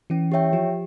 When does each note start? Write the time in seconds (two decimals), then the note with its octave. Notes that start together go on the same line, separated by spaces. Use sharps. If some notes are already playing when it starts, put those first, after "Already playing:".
0.10 E3 C#4
0.32 G4 C#5 E5 G5
0.53 F3 G4